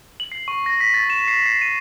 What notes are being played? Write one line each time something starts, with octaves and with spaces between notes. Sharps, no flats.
F#7
C7
C#6
A#6
B6
A6
E7
C7
C7
D#7